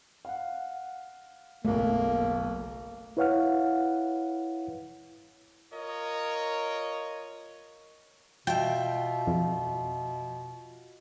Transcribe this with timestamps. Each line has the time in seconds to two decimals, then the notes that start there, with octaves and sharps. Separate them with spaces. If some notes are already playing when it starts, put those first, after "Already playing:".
0.25 F5 F#5
1.65 F#1 B1 A3 A#3
3.17 E4 B4 C#5 F5 F#5 F6
5.73 F4 A#4 C#5 D#5
8.47 B2 F4 E5 G5
9.27 F2